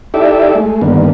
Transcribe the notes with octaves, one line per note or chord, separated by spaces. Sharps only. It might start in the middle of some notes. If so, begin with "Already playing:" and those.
D#4 E4 G4 A4 D5 E5
G#3 A3
G2 D3 D#3 A#3 B3